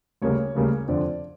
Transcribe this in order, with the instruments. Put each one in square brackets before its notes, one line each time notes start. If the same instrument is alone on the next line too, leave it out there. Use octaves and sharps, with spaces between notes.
[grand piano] D2 C#3 G3 A#3 C#5
D2 C#3 G3 A#3
F2 D3 F3 D5